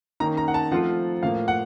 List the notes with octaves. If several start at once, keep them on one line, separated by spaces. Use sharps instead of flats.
D#3 A#3 C#4 A#5
A#5
F#5
A5
F3 A3 C4 F4 F#5
A2 F3 A#3 F5
F#5